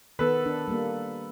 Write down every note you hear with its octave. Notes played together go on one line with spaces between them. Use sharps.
D#3 B3 A4 B4
D4
G3 A#3